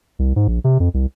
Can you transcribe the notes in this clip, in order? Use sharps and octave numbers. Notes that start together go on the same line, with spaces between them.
C2
G#2
A#1
C3
F2
C2